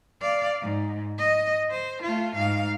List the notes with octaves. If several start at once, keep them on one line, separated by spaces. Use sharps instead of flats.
D5 F5
G#2
D#5
C5
A3 F4
G#2 F5